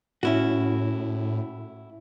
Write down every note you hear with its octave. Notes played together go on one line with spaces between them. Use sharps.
A2 C#4 E4 F#4